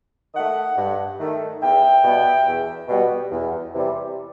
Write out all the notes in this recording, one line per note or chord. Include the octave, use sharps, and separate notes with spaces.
D#3 A3 D#5 F#5
G2
D#3 A3
E2 E5 G5
B2 G3 B3
E2
B2 G3 B3
E2
C3 E3 G3